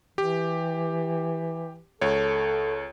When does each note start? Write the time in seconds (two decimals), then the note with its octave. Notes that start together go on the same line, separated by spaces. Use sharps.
0.18 E3 G4
2.01 C#2 A4 C#5